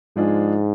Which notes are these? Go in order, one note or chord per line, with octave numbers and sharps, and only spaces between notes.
G#2 F3 G#3 D4 F4 G#4